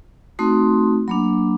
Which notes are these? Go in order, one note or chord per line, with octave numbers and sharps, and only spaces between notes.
A3 C4 D#4 F#4 C6
F#3 A#3 D4 B5